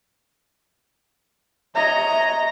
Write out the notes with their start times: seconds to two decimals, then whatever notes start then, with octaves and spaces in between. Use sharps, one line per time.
1.75 C#5 D#5 E5 A#5